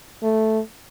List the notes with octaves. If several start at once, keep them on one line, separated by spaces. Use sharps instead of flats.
A3